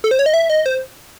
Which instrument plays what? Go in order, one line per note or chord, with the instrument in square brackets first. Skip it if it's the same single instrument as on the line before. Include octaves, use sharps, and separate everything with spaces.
[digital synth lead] A4
C5
C#5
D#5
E5
D#5
C5